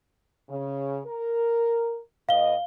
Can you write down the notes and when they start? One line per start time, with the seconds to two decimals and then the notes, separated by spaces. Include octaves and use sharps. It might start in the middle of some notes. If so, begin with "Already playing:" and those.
0.49 C#3
1.06 A#4
2.29 A2 B4 D#5 F5 G7